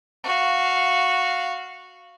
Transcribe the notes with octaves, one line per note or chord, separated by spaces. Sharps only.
F#4 F5